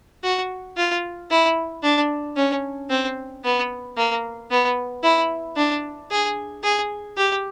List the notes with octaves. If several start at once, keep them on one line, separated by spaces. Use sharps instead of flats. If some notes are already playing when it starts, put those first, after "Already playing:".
F#4
F4
E4
D4
C#4
C4
B3
A#3
B3
E4
D4
G#4
G#4
G4